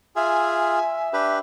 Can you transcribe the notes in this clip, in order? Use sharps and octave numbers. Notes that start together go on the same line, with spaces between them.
F4 G#4 E5 G#5
D4 G4 B4